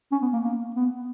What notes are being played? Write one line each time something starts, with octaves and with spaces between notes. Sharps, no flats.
C#4
B3
A#3
A#3
B3